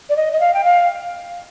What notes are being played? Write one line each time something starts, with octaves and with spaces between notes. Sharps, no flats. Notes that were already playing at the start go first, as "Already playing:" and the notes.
D5
D#5
D#5
F5
G5
F5